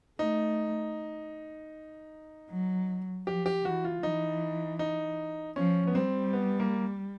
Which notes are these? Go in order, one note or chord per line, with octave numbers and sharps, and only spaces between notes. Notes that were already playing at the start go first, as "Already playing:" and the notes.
A3 D#4
F#3
F3 G4
G4
E3 F#4
F4
E3 D#4
D#4
F3 C#4
B3
G3 C4
B3
A#3